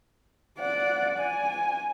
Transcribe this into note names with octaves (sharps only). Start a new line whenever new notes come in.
D5 F#5
G#5